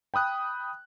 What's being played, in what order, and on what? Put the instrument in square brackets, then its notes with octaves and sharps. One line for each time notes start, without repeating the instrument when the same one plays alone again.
[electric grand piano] G5 B5 D#6 F#6